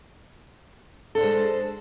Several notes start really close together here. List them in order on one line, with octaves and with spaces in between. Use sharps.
A4 D4 C5 G#3